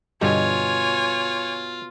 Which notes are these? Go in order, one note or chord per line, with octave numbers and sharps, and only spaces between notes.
G2 B2 D3 G3 F4 C#5 G#5